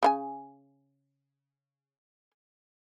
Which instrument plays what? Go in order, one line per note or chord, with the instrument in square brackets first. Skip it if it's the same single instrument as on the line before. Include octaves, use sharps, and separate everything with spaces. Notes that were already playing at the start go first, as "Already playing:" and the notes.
[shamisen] C#3 F4 G#5